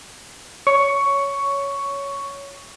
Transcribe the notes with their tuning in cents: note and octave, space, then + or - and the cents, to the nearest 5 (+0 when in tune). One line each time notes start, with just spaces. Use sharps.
C#5 +10 C#6 +10